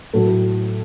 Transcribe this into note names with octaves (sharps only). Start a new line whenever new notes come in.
A2 F#3 A3